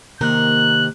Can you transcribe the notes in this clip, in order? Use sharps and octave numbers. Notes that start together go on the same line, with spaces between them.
C3 D#3 A#3 A#4 F#6